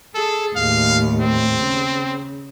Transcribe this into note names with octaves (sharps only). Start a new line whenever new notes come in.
G#4 A4
D#2 A2 F5
C4
C#3